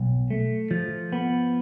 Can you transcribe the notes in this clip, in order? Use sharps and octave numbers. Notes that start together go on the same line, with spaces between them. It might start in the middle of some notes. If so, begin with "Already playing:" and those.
Already playing: B1
A3
F3
B3